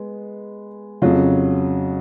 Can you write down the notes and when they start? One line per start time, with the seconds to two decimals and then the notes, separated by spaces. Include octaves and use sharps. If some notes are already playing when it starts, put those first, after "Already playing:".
Already playing: G#3 B3
1.02 F2 C#3 F#3 F4